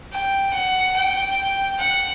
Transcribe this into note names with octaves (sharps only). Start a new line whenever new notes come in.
G5
F#5
G5
F#5